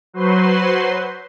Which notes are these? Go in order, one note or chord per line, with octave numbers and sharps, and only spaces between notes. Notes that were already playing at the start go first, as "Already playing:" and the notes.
F#3 F#4 B4 C5 C6